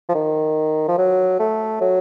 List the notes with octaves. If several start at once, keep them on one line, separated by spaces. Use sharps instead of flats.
F3
D#3
F3
F#3
A3
F#3